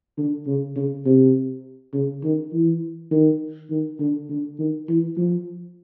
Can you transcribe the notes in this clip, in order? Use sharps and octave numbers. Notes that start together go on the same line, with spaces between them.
D3
C#3
C#3
C3
C#3
D#3
E3
D#3
D#3
D3
D3
D#3
E3
F3